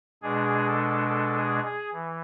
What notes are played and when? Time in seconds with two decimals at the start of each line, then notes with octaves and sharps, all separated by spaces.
0.22 B2 G#3 D4 G#4
0.66 A4
1.08 A4
1.37 G#4
1.65 G#4
1.93 E3